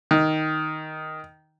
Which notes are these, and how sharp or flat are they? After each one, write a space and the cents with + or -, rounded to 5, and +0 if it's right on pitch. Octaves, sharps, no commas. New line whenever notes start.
D#3 +5